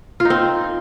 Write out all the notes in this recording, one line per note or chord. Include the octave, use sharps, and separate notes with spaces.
F4
D#4
C4